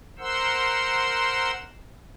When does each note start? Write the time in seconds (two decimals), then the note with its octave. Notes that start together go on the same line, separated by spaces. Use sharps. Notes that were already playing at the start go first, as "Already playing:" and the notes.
0.19 A#4 C5 F#5 C6 E6